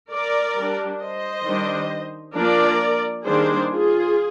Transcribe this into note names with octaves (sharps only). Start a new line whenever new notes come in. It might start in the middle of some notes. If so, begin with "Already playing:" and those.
A#4 D5
G3 D4
C5 D#5
D#3 G3 D4
F3 A#3 D4 A#4 D5
D#3 G3 A#3 D4 G#4 C5
F4 G#4